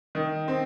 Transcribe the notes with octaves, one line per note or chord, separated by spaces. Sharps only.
D#3
C4